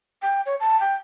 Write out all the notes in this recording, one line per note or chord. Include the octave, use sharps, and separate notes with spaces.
G5
C#5
A5
G5